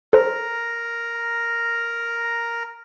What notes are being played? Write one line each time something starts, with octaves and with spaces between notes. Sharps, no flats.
A4 A#4 C5 A#5